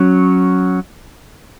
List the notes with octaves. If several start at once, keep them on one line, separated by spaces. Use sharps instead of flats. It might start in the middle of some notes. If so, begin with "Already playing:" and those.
Already playing: F#3 C#4